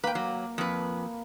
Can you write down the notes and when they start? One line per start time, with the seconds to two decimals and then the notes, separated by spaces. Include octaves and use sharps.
0.04 A#3 B4 G5
0.15 F#3
0.58 F2 B4